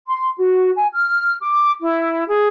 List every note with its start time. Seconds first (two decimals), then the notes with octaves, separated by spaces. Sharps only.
0.07 C6
0.37 F#4
0.74 G#5
0.91 F6
1.41 D6
1.80 E4
2.27 G#4